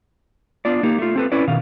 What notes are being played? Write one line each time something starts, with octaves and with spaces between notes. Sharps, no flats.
B3 D4 F4 D5
A#3 D#4 G4
A3 F4
C4 A4 B4
C#4 E4 B4 D5
B2 D#3 F5